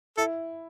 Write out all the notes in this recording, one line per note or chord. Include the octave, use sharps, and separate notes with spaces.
E4 A4